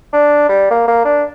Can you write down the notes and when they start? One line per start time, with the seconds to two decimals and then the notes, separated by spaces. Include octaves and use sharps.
0.13 D4
0.49 G3
0.71 A#3
0.88 A#3
1.05 D4